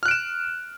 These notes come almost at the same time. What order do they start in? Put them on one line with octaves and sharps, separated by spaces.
F6 F#6 D7 E7